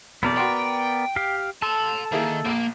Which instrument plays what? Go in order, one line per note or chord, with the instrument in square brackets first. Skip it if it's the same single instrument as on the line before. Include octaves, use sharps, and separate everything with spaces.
[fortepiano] B1 E2 B2 [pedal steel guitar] B3 A#4 D5
[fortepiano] F#4 C6 [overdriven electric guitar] G5
[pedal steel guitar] G4 F5
[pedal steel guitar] A4 [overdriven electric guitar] A5 C6
[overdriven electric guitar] D#3 [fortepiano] A#3 E4 G#4
[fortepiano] A#1 [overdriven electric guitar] A#3